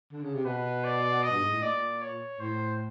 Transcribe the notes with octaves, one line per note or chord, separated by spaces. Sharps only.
D3
C#3
C3
B2 B4
D5
D#5
G2
G#2
A2
A#2 D5
C#5
A2 C5